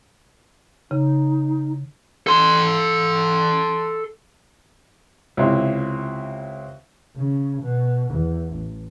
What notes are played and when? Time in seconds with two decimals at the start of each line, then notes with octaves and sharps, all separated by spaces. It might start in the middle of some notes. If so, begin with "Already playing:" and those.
0.91 C#3 D#4
2.27 A4 C6
5.37 C#2 C3 E4
7.17 C#3
7.62 B2
8.11 E2
8.54 A1